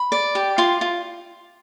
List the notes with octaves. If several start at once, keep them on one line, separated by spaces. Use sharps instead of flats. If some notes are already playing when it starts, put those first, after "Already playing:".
Already playing: B5
D5
G4
F4 C6
F4